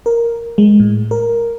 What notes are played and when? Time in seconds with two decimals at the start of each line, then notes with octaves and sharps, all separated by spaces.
0.06 A#4
0.58 G#3
0.80 A2
1.11 A#4